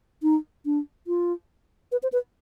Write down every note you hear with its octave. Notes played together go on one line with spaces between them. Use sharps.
D#4
D4
F4
B4
C5
B4